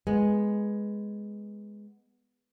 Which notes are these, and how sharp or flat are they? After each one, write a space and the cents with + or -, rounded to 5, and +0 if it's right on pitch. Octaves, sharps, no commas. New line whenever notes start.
G#3 +0 B3 +0